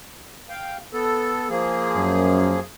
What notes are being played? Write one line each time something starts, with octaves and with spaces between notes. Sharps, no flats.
F5 G5
B3 A4
F3 A#3 G#4
F#2